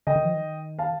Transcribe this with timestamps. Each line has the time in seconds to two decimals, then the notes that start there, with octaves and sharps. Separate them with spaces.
0.07 D3 D#5 G5
0.16 D#3
0.25 F3
0.34 D#3
0.79 F5 A5